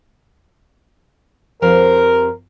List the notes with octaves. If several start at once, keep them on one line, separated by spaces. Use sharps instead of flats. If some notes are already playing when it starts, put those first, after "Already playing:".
F2 G4 A#4 C5